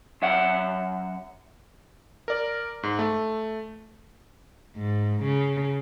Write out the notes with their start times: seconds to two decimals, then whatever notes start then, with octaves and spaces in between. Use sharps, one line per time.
0.22 F#2 E5 F#5
2.28 A#4 D5
2.83 G#2
2.99 A3
4.76 G#2
5.23 C#3